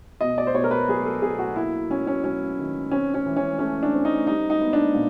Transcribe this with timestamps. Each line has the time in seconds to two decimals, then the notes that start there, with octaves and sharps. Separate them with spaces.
0.21 B2 D#5
0.38 D5
0.47 C5
0.54 B2 C#5
0.64 A#4
0.71 B4
0.88 F#3 G#4
1.05 A4
1.22 B2 G#4
1.39 F#4
1.56 A#3 E4
1.90 F#3 C#4
2.07 C#4
2.24 F#3 C#4
2.58 D#3
2.91 C4 C#4
3.14 C#4
3.26 E3
3.36 C#4
3.59 A3 C#4
3.83 D4
3.93 C4
4.05 D#4
4.27 G3 D#4
4.50 D#4
4.61 B3
4.73 D4
4.94 A#2